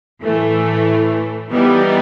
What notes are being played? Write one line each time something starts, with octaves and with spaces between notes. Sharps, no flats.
A2 E3 A3
E3 G3 B3 D#4